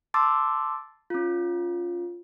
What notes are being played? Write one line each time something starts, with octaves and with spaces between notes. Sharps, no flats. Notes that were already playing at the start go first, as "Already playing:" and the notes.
A5 C6 D6 E6 A6
C#4 F4